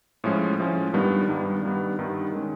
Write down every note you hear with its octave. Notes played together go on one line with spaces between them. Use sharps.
A2 F3 G#3 C#4
A2 F3 G#3 C#4
G2 D#3 G3 B3
G2 D#3 G3 B3
G2 D#3 G3 B3
G2 D#3 G3 B3
D#3 G#3 C#4